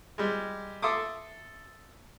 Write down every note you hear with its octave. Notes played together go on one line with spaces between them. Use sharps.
G3 G#3
A4 E5 C6 D6 D#6